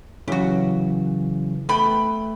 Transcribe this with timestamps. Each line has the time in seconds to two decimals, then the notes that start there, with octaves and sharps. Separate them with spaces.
0.28 C#3 E3 F#3 F#4 G4
1.69 A3 B3 G5 B5